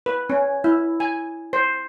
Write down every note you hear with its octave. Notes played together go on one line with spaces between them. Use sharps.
B4
C#4
E4
G#5
C5